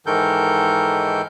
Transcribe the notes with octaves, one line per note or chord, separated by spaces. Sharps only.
G#2 D#3 E3 A4 A#4 G6